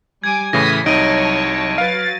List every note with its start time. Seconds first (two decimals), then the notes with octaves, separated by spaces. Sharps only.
0.24 G3 G#5 D6 G#6
0.53 A2 C#3 E3 D#6 A#6 B6
0.86 C2 F#3 D#4 C#5 D#5 A5 D7 D#7
1.78 F#3 B4 F5 A6 D7